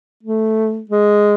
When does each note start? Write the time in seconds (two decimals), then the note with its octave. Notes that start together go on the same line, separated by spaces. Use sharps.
0.23 A3
0.90 G#3